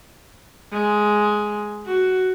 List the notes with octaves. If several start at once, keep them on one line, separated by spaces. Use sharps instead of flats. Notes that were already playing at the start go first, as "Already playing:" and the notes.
G#3
F#4